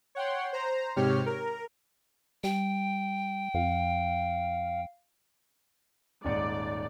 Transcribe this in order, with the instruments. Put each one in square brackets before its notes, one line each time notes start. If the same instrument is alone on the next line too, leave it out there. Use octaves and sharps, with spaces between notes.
[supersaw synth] C#5 F#5 G5 C6
C5 A#5
G#2 C3 G4 C#5 F6
A#4
[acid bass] G3 [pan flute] G5
[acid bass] F2 [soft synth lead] F5
[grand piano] D#1 G#2 C#7 [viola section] D5